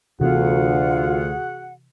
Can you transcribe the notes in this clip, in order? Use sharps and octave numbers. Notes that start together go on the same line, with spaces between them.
D2 C3 E3 B3 F4 F#4 G#4 F#5